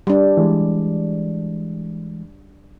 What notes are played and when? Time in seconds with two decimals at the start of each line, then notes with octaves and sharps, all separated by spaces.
0.07 G3 D4
0.37 E3 G#3